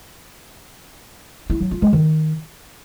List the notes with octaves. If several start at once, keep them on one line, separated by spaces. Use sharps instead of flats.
E4
F#3
F4
G#3
D#3